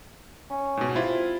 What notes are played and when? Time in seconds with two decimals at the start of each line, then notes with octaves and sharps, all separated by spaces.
0.50 C#4
0.77 G#2 B2
0.95 C3 E4 F4